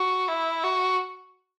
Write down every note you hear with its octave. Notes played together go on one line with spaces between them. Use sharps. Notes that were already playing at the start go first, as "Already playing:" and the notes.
Already playing: F#4
E4
F#4